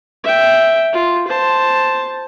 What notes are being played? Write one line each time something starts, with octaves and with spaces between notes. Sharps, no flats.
E5 G5
F4
C5 A5